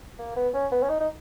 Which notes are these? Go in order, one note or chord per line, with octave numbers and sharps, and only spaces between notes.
A#3
B3
C#4
B3
C#4
D#4
D#4